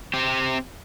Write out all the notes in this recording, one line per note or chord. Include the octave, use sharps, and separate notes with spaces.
C4 G4